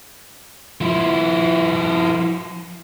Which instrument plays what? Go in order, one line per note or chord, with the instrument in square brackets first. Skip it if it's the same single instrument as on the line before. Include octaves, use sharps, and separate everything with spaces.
[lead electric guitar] F3 E4